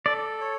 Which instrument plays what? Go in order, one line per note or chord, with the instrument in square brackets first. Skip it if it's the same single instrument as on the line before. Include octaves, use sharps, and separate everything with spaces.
[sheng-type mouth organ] A4 [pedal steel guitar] D5
[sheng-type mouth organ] C#5